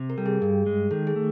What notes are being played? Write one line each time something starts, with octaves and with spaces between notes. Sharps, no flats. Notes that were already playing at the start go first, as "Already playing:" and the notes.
Already playing: C3
A#4
G3 A4
G#4
G2 G#4
G#3
D#3 A4
G#4
A3